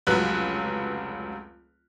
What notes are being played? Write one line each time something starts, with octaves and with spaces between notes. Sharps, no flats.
F1 C#2 F#3 B4 F#6